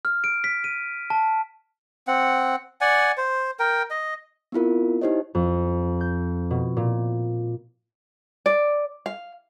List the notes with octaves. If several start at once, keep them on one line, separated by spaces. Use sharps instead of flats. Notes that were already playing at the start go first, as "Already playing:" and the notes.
F6
D7
B6
D#7
A5
C4 F#5
D5 F#5 G#5
C5
A#4 G5
D#5
B3 C4 E4 F4 A#4
D#4 E4 G4 C5 C#5 D#5
F2
G6
B2
A#2
D5
F5